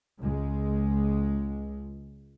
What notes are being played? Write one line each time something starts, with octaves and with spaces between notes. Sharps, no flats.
C#2 G#3